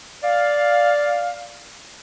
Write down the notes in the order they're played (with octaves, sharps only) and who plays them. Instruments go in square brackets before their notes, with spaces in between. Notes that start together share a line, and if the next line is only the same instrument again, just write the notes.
[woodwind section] D5 F5